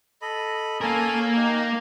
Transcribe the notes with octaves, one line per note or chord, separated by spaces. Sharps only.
A4 D#5 B5
A#3 C#4 A4 A#4 G#5
D#4 G4